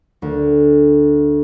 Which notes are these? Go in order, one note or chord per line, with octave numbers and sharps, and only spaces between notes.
D2